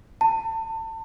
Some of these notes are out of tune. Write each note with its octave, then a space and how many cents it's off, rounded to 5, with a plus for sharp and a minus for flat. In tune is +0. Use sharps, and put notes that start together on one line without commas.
A5 +30